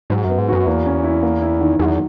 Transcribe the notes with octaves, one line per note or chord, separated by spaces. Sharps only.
G#2 F#3
F#2 B3
G#2
F#2 F#4
E2 A#3
C#4
E4
A#3
E4
D#3
E2 F#3